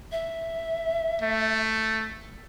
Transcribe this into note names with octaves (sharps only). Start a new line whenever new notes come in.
E5
A3